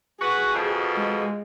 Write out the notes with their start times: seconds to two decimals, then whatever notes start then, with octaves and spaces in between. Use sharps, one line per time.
0.21 F#4 G#4 B4
0.54 F2 B2
0.97 G#3